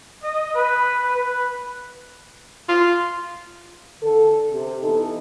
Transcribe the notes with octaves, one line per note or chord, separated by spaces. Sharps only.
D#5
B4
B4
F4
D3 A4
C3
E3 B3 D#4 A4